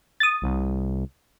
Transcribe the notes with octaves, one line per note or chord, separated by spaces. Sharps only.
D#6 A6
C2